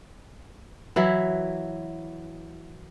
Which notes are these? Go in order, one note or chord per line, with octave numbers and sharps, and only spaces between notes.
E3 F#3 E4